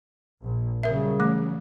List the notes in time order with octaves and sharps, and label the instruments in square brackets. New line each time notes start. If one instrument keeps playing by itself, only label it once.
[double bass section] A#1
[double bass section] C#3 F#3 G3 [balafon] A#4 E5
[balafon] E3 A3